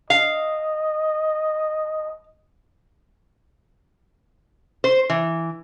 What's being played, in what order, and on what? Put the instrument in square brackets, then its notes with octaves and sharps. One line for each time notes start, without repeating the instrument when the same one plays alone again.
[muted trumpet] D#5 [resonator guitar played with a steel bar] F5
[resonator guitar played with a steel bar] C5
E3